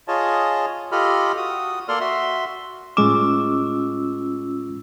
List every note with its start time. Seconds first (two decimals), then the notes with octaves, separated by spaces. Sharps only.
0.08 F4 G#4 C#5 D#5 A5
0.92 F4 G4 A4 D#5 B5 F6
1.37 F#4 D#6
1.88 A#3 A4 D5 C6 F6
2.00 F#4 E5 C6
2.97 A2 G#3 C#4 F4 D6 E6